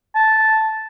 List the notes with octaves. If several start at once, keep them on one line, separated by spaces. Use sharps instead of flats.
A5